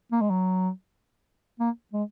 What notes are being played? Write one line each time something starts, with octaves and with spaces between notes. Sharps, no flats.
A#3
G#3
F#3
A#3
G#3